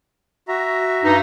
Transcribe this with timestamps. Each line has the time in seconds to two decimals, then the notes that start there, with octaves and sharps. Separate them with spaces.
0.48 F#4 E5 A#5
1.04 G2 D#4